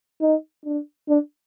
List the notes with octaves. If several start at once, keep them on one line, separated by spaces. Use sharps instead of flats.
D#4
D4
D4